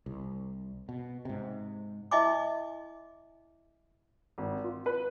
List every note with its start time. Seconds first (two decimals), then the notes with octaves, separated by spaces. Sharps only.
0.06 C2
0.89 B2
1.25 G#2 C3
2.11 E4 D#5 E5 G#5 C6 D6
4.38 G#1
4.64 F4
4.86 B4